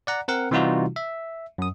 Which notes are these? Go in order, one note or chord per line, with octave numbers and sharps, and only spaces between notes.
D5 F#5 A#5
C4 A#4 F#5
C3 E3 G3 D#4 F4 F#4
E5
F#2 D#6